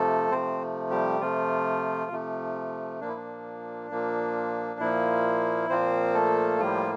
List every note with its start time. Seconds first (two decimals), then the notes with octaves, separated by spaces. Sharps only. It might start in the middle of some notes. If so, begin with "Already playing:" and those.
Already playing: C3 F3 A3 A4
0.31 C3 F3 A3 C4 C5
0.91 G3 G4
1.21 C3 F3 A3 F4
2.11 C3 F3 A3
3.01 A#2 F3 A#3 D4
3.08 E4
3.16 D4
3.91 A#2 F3 A#3
4.80 A#2 F3 A#3 E4
5.69 A#2 F3 A#3 C4 C5
6.14 A3 A4
6.59 A2 F3 G3 A#3 F4